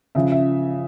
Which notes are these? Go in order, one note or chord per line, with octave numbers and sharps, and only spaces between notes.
C#3 F3 E5
E5